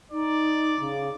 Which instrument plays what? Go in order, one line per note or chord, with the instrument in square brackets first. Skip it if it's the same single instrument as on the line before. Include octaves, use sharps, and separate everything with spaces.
[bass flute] D#4 [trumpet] D5
[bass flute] C#3